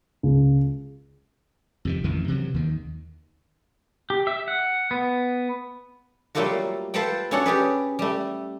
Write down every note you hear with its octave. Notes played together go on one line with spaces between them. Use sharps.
C#2
F2 C3 D#3
A1 F2 D#3 E3
C3 E3 F#3
D#2 D#3
G4
E5
F#5
B3
F#3 G3 A3 A#3 F4 F#4
F4 A4 B4 C5 F#5 G5
C#4 D4 F#4 A4 C#5 F#5
C#4 G4 G#4 B4
G3 A3